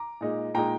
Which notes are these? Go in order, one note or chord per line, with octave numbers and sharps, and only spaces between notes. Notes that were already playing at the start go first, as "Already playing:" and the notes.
Already playing: A#5 D6
A#2 G#3 D#4
A#2 G#3 D#4 G5 A#5